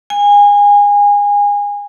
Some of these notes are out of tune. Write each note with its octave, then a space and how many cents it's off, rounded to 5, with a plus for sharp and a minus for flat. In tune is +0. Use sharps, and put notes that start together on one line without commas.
G#5 -25